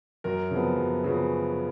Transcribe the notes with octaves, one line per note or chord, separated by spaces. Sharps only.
F#2 A#4
C#3 F3 B3
F#2
C#3 F3 B3